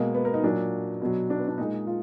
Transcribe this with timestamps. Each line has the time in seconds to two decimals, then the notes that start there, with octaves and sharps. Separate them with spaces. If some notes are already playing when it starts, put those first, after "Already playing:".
Already playing: B2 G#3 A#3
0.14 B3
0.25 A#4
0.34 D#4
0.43 A#2 F#3 D4
1.01 B2 F#3
1.30 D4
1.39 B3
1.48 D4
1.58 A#2 G#3 D#4
1.87 F4